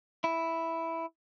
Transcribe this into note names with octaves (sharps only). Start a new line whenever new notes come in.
E4